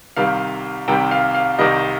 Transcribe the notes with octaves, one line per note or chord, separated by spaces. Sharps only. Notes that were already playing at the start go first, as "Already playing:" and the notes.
C2 C3 D#3 G3 F5
C2 C3 D#3 G3 G5
F5
F5
C2 C3 D#3 G3 D#5